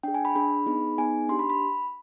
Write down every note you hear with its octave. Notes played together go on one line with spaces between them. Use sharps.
D4 G#4 G5
G#5
B5
D4 G#4 B5
B3 D#4 G#4
B3 D#4 G#4 G#5
D4 G4 C6
B5
B5